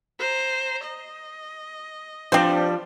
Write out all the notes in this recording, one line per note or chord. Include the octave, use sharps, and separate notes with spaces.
C5 A#5
D#5
F3 G3 C4 D4 C5